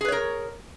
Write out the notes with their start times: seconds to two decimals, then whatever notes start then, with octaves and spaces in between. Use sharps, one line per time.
0.01 G#4
0.05 B4
0.08 C#5
0.12 A#4